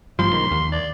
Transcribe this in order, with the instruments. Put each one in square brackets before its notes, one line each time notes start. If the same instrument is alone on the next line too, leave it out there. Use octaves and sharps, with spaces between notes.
[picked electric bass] A1 G2 F3 [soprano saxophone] C6
[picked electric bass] B1 G#2 D#3
D#2
[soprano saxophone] D5